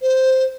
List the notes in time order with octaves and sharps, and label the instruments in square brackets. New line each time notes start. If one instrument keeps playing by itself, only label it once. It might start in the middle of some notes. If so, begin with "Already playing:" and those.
[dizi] C5